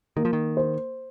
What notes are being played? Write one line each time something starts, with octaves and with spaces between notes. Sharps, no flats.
D#3 A#3
F3
D#3
C5